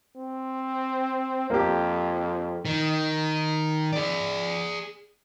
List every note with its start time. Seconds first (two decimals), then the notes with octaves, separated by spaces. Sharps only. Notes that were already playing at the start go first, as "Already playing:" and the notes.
0.16 C4
1.50 F2 A#3 G4
2.65 D#3
3.93 G#4 D5